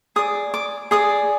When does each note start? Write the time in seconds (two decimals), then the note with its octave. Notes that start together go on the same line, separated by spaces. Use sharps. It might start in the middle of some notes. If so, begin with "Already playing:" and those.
0.16 G#4 D5 D#6
0.54 D6
0.91 G#4 D5 D#6